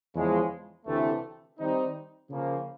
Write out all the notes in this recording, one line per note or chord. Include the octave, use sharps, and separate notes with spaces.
E2 C#3 F3 G#3 C#4
D2 C3 E3 A3
D#3 G3 C4 D#4
C#3 F3 A#3